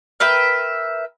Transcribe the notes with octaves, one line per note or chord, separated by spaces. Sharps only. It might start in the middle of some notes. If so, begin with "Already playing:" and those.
A#4 B4 E5 G5